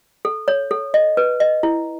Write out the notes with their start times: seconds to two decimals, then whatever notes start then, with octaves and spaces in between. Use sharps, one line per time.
0.25 A4
0.48 C#5
0.71 A4
0.94 D#5
1.17 B4
1.40 D#5
1.63 E4